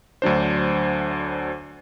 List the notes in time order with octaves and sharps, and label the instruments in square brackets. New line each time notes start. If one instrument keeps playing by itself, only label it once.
[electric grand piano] D2 F#3 D4 C5